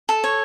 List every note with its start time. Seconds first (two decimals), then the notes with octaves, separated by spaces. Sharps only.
0.09 A4
0.24 C#5